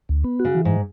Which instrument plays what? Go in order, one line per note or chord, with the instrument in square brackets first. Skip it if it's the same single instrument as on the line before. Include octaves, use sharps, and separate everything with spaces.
[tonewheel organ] D2
B3
F#4
[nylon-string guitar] C#3
[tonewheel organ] E3
[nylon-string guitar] G#2